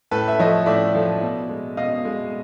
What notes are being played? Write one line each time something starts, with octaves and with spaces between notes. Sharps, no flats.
A2 A4 B4
E5
F3 A3 C#5 D#5
A2 D5 E5
F3 A3
B2
G#3
B2 D#5 F5
G#3